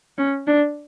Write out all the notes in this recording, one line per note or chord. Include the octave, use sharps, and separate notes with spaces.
C#4
D4